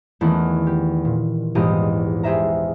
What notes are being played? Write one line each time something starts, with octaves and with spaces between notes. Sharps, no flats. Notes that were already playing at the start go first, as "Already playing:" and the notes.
E2 D#3 A3 A#3 C#4 F#5
G4
A#2
A#1 E2 G#2 A#3 G4 D#5
G4 G#4 C5 E5 A#5